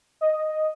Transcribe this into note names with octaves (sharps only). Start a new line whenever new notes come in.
D#5